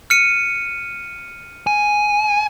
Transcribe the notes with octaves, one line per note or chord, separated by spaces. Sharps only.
F6 C#7 D#7
G#5